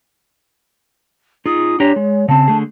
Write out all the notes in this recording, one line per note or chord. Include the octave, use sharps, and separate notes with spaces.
D#4 F4 G#4 D#6
D4 G4 C#5 A#5
G#3
C#3 C4 A5
D3 A3 G#4